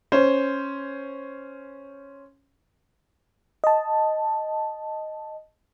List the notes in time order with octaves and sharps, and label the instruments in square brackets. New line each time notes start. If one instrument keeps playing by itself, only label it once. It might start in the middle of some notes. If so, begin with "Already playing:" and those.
[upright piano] C#4 C5
[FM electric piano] D#5 A5